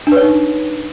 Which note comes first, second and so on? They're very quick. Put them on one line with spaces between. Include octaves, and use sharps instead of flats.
D4 B4 C#5 D#4